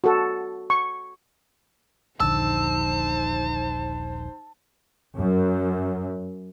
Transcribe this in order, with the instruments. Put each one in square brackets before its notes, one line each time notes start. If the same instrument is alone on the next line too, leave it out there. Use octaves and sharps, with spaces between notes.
[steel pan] F#4 A4
C#6
[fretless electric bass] D#1 A#1 D3 [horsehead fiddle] D#4 C5 [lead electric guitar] A5 [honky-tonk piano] E6
[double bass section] F#2